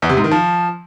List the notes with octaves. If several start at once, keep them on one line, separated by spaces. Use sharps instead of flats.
E2
C3
G#2
D#3
F3